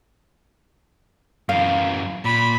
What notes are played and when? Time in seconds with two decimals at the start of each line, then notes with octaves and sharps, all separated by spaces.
1.49 F#2 E3 F5
2.25 A#2 B5